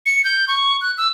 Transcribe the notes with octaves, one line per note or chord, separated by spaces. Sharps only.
C#7
G6
C#6
F#6
E6